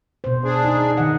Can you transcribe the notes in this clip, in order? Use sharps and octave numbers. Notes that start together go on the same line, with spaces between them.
B2 C5
D4 G#4
D#4
D#3 D#5 F#5